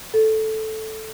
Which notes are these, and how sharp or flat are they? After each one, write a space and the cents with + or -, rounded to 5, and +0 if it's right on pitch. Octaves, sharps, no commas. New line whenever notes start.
A4 -5